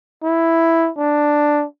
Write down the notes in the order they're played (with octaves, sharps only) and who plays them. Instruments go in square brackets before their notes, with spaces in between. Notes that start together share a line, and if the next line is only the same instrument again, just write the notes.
[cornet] E4
D4